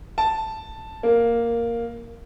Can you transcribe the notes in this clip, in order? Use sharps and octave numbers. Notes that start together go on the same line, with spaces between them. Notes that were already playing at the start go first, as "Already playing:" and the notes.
A5
A#3